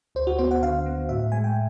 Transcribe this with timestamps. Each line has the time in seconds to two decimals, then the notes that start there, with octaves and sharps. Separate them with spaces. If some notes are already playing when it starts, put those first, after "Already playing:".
0.15 D2 C5
0.27 F#4
0.38 B3 C5
0.51 F#5
0.63 D3 F5
0.86 B3
1.09 A2 E5
1.32 G#3 G#5
1.44 G5